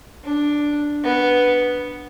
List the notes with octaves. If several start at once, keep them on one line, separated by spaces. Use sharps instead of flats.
D4
B3